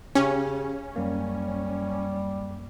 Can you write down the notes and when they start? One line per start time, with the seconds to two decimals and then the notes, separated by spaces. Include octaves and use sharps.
0.15 C#3 C#4 G4
0.96 F#2 G3 A#3